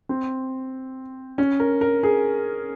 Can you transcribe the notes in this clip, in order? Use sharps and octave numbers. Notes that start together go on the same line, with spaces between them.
C4
C#4
A#4
A#4
G#4